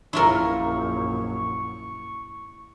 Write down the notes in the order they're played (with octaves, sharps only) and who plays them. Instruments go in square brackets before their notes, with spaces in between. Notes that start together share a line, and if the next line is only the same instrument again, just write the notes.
[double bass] A#1 F#2 [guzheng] E4 F4 A#4 [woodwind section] C#6